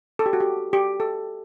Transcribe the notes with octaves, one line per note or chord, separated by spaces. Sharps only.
A4
G4
F#4
G4
G4
A4